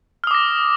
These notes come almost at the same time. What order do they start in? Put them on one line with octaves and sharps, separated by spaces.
F6 D#6 D6 A#6